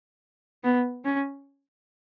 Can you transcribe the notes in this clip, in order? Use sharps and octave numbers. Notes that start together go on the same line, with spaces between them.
B3
C#4